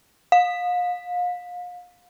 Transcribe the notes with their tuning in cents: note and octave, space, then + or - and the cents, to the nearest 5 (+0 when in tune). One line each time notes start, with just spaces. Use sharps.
F5 +35